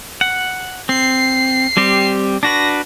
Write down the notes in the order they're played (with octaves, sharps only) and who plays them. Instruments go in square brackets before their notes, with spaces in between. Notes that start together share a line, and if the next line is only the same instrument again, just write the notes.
[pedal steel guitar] F#5
[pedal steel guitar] C4 [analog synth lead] C7
[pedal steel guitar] G3 C4 G4
[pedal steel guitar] D4 F#4 B4 [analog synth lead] A#6